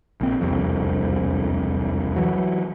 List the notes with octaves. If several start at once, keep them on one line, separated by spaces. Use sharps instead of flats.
A#1 C4
E1 C2 F2
E3 F#3